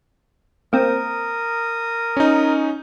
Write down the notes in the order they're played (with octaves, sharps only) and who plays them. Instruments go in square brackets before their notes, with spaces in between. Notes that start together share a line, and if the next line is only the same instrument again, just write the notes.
[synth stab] A#3 C4 [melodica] A#4 D#6
[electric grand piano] C#4 D#4